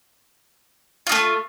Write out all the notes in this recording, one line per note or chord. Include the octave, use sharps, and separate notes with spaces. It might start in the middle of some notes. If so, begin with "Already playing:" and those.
A3 D#4 F4